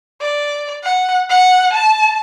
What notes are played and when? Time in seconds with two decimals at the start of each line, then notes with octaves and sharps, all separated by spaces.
0.21 D5
0.84 F#5
1.30 F#5
1.73 A5